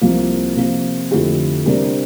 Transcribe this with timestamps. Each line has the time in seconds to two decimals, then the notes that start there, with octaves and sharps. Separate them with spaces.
0.01 C2 C3 F3 A#3
0.56 C3 F3 A#3 F4
1.11 F2 D3 A3 E4 G4
1.66 C3 G3 D4 G4 A#4